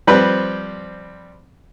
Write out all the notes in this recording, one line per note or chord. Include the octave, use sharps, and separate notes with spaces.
F3 G3 C4 B4